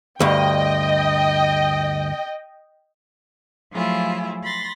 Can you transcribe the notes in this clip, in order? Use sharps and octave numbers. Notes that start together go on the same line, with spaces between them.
D2 G2 D#5 G5
F3 F#3 A3 E4 F4 G#4
B5 C6 A6 A#6